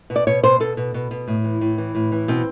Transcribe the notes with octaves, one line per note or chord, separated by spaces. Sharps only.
B2
D5
B2 C#5
B2 C5
B2 A4
B2
B2
B2
A2
E3
A2
E3
A2
E3
B2 C4